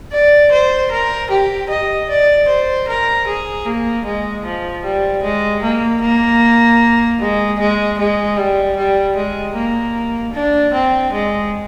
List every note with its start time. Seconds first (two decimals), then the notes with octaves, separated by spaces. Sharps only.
0.12 D5
0.52 C5
0.92 A#4
1.31 G4
1.70 D#5
2.09 D5
2.49 C5
2.88 A#4
3.28 G#4
3.66 A#3
4.06 G#3
4.45 F3
4.84 G3
5.23 G#3
5.63 A#3
6.02 A#3
7.20 G#3
7.59 G#3
7.99 G#3
8.37 G3
8.76 G3
9.16 G#3
9.55 A#3
10.33 D4
10.74 C4
11.13 G#3